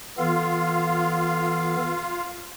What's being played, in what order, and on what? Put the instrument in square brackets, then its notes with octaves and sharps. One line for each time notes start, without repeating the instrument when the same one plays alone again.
[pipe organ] E3 B3 A4 [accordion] F4 F5